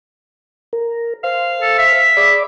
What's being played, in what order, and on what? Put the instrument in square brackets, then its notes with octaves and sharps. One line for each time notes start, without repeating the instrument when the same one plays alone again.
[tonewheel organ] A#4
[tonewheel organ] C5 [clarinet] F5
[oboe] A4
E5
[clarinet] G#4 [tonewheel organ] D5 B5 D6